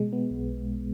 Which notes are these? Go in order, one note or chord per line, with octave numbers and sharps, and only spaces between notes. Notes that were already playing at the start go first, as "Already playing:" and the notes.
Already playing: B2 G#3
B3
B1